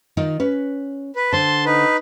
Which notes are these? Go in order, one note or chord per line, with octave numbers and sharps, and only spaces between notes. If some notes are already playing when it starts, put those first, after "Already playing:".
D#3 D#4 F4
C#4 B4
B4
D3 C5 A5 C6
D#4 B4